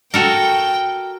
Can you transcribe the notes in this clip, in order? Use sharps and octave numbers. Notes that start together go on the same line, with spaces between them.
F#4 A4 A#4 G5